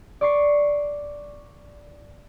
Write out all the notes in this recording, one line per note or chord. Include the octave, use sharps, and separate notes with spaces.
D5 C#6 C7